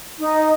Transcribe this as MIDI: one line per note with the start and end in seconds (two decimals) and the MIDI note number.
0.19 0.51 63